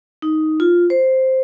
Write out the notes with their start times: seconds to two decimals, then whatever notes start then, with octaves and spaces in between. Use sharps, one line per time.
0.22 D#4
0.60 F4
0.90 C5